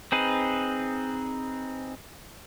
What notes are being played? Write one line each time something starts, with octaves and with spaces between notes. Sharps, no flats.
C4 D#4 G#4 B4